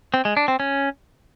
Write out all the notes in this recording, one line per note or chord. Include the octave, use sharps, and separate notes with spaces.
C4
G#3
D4
C4
C#4